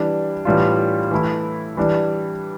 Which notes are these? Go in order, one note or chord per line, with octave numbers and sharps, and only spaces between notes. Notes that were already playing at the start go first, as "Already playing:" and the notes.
Already playing: E3 G3 D4
A2 E3 G3 D4 F4
E3 A3 E4
E3 G3 D4